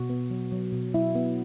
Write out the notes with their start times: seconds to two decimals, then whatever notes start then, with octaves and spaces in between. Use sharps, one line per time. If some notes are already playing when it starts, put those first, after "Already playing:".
Already playing: B2 F#4
0.10 B3
0.30 F#3
0.52 F#3
0.72 B2
0.94 F#3 E4
1.15 B3